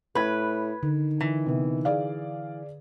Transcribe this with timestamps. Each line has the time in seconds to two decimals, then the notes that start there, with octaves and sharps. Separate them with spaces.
0.15 A2 B4 B5 G#6
0.83 D3 D#3
1.21 E3
1.46 C3 B3
1.85 G#4 D5 F5